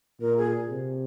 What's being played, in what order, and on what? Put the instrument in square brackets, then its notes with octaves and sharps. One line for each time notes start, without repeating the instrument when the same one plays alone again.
[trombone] A#2 [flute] A#4
[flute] G#4
[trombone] C3